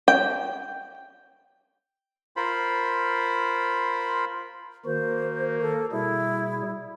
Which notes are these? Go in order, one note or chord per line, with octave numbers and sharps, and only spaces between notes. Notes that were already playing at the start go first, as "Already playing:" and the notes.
G5
F4 A#4 C5 B5
D#3 A#3 F#4 C5
A4
B2 G3 E4 G#4